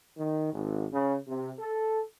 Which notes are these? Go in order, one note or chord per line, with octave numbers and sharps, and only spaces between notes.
D#3
G#1
C#3
C3
A4